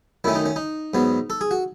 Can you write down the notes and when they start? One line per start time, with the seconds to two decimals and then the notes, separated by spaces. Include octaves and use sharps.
0.24 F#2 D#3 A3 C#4 E4
0.35 D#4
0.46 C#4
0.56 D#4
0.94 G#2 F#3 B3
1.30 A4
1.41 G#4
1.51 F#4